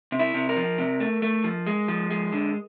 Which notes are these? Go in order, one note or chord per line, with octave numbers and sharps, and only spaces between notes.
C3
E4
C3
A#4
F3
C3
A3
A3
F3
G#3
F3
G#3
D3